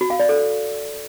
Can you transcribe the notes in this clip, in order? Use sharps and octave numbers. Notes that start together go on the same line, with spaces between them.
F#4
F5
D5
A4